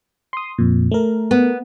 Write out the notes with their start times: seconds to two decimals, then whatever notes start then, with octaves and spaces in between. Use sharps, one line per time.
0.33 C6 D#6
0.58 F2 A#2
0.91 A3 A#4
1.31 B3